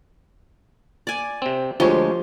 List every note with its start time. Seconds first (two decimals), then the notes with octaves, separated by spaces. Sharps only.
1.07 D5 G#5
1.42 C3 C4
1.80 D2 F3 G#3 G4 C#5 C6